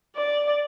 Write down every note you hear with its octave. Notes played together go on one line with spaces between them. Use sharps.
D5